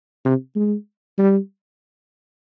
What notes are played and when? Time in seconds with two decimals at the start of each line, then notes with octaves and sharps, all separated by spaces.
0.25 C3
0.56 G#3
1.18 G3